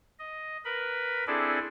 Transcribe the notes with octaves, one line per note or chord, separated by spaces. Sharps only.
D#5
A#4 B4 B5
C4 D4 E4 G#4 A4 D5